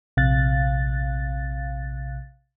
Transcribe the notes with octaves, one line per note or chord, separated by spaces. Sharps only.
A#1 C3 F5 F#6 A6